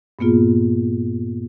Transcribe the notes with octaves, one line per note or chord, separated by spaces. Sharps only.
G2 A#2 A#3 B3 F4 G#4